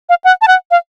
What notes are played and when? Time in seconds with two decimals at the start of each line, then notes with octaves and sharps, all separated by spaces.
0.09 F5
0.24 F#5
0.42 A5
0.48 F#5
0.71 F5